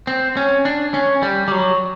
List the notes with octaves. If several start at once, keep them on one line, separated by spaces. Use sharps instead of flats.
C4
C#4
D4
C#4
G3
G3
F#3